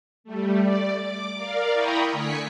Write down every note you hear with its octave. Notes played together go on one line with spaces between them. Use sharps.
G3 A3
D5
D6
A#4 D5 F5
E4 G5 A#5 B5 C#6 D#6
D3 A3 G#5 B6 C#7